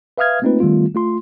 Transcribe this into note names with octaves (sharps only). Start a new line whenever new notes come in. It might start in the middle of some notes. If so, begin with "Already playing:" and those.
B4 E5 F5 D#6 F6 G#6
A3 A#3 C4 D#4 F4 B4
D#3 G3 A3 B3 F4
A3 F4 C6